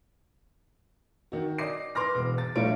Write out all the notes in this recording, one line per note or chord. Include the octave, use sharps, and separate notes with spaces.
D#3 F#4
D5 D#5 D6 C7
B4 C6 D6 F6 A#6
E1
A6
A#1 A3 D4 F4 C#5 D7